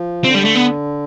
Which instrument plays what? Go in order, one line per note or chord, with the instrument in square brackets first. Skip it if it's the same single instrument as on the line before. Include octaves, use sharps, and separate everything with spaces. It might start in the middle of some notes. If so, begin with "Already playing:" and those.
Already playing: [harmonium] F3
[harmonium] D3 [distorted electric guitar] C4
[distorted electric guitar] G3
A3
B3